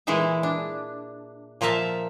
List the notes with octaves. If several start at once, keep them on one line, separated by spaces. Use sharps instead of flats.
A#2 E3 G#3 E4 G#4 E5
D4
A#2 F3 A#4 E5 A5